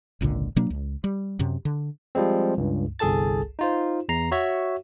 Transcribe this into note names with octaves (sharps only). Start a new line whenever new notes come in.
G#1 C#2 A#2 D3
B2 F#3 A#3 D4
C#2
G3
F#2 C3
D3
F3 G3 G#3 C4
C#2 G2
G1 C2 G#4 A4 A5 A6
D#4 F4 C5
E2 A#5 C7
F#4 C#5 E5